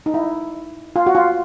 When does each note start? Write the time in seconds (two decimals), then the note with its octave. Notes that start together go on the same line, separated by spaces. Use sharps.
0.06 D#4
0.14 E4
0.96 F4
1.07 F#4
1.15 F4